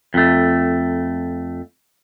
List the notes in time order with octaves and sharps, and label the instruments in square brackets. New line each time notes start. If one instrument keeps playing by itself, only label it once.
[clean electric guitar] F2 A3